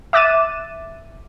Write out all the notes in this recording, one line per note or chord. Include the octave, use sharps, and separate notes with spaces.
E5 D6 F#6 A6 D#7 E7